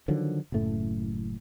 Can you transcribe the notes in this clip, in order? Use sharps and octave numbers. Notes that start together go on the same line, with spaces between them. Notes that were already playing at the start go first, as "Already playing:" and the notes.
D3 D#3 F3 F#3
F#1 F#2 A2 A3